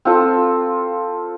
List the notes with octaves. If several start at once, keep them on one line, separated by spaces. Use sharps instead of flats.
C4 F4 A4